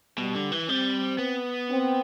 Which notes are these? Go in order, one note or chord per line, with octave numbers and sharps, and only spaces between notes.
B2 G3
D3
E3
G3 C4
B3
C4